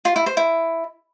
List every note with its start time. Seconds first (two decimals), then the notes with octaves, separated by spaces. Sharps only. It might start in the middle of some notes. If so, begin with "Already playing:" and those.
0.05 F4
0.16 E4
0.26 C5
0.37 E4